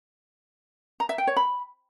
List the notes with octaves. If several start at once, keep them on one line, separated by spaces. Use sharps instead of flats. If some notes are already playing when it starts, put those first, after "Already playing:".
A#5
E5
G5
C#5
B5